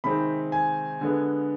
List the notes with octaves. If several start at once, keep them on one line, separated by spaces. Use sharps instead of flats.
C3 D#3 G#3 C4 B5
G#5
D3 G#3 B3